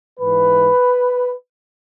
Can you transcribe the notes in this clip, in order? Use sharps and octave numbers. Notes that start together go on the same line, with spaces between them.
G#2 E3 B4